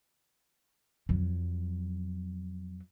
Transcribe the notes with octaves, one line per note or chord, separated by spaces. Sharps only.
F2 F#3